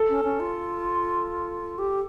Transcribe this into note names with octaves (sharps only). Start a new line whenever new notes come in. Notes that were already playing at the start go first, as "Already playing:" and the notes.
Already playing: A4
C#4
C#4
F4
G4